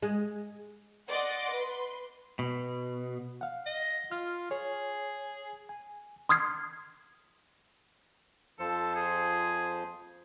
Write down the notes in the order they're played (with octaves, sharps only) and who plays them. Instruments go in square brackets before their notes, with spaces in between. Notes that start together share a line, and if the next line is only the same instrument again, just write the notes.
[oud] G#3
[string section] D5 D#5 F#5 C6 D6
B4 C6
[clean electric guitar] B2
[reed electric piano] F5 F#5
[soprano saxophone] D#5
[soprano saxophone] F4 [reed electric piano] F6
[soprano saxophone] G#4 [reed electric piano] C#5
[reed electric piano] G#5
[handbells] C6 D#6 F6 G#6 C7
[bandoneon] F2 F3 C5 [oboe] A4
[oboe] G#4